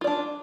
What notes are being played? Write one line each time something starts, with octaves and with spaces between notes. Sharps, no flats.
D4 F4 D5